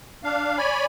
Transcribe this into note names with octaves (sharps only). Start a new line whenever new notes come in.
D4 F5
C#5 D5 G#5 B5